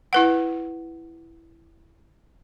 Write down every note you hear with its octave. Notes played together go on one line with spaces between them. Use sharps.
E4 B4 F#5